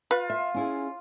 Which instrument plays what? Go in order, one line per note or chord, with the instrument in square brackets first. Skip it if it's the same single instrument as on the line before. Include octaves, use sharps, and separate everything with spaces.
[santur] F4 [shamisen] B4
[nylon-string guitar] E5
C#4 E4 G#4